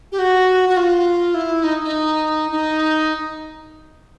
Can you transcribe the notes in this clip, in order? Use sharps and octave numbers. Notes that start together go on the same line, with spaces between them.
G4
F#4
F#4
F4
E4
D#4
D#4
D#4